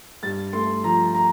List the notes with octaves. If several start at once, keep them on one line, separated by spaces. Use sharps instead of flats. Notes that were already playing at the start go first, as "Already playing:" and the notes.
G2 A6
A3 C6
F3 A#5
A#5